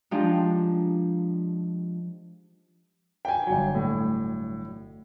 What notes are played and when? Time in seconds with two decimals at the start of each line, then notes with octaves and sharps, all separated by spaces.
0.11 F3 G#3 D4 D#4 G4 G5
3.25 G5 G#5
3.47 G1 F#3
3.75 A2